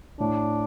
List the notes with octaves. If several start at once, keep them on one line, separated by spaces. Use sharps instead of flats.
A2 D4